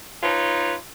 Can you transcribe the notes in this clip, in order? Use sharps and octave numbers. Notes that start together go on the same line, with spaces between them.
D#4 F4 B4 C#5